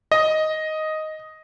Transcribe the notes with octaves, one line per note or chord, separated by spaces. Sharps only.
D#5